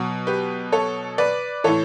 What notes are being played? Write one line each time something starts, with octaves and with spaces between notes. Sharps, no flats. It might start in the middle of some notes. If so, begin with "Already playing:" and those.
Already playing: B2 F#3 F#4
G4 B4
A4 C#5
B4 D5
A2 E3 A4 C#5